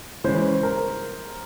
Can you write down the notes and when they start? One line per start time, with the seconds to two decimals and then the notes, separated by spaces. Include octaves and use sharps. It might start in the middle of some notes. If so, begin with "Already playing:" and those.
0.24 C#3 E3 G#3 C#4 C5
0.63 A#4